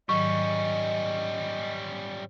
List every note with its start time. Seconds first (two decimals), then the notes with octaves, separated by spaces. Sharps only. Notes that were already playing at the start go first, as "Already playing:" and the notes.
0.09 G#2 D#3 F#3 G3 C#4 D#5 C#6